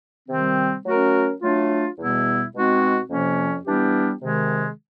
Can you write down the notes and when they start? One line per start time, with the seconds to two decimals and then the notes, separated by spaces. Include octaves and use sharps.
0.28 C3 D#3 G3 C4
0.85 F#3 A3 C#4 F#4 A#4
1.42 F#3 A3 D4 F4
1.97 E2 B2 G3 B3 E4
2.54 B2 G#3 C4 D#4 F#4
3.10 F2 C3 F3 A#3 C#4
3.66 E3 G3 B3 D4 G4
4.22 C3 D#3 G#3